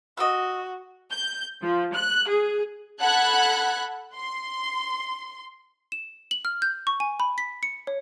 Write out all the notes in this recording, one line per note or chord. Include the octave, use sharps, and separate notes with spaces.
F#4 D#5 E6
G6
F3
F#6
G#4
A4 F#5 B5 F#6 G#6
C6
E7
F#7
F6
G6
C#6
G#5
B5
B6
C#7
C#5